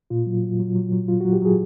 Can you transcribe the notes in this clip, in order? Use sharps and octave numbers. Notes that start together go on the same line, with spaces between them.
A#2 F4
F#3
F#3
F#3
F#3
F#3
F#3 F4
F#3 F#4
G4
F#3 G#4